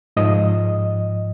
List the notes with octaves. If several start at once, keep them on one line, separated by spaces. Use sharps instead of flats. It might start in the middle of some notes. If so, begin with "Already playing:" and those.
G#2 F3 D#5